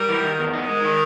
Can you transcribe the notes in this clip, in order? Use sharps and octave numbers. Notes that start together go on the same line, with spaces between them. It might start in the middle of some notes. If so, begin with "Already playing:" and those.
Already playing: G3 A#4
E3
D#3
E2
D#4
G#3 A#4
D#3